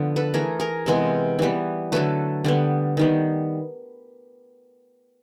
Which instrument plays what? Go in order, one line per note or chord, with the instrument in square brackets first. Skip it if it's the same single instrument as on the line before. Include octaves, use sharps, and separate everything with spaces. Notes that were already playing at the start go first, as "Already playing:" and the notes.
Already playing: [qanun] D3 F3 B3
A4 B4
E3 A3 G#4 A#4
G#4 A#4
C3 E3 G#3 B3
E3 G3 B3
D3 F#3 A3 A4 B4
D3 G3 B3
D#3 G3 B3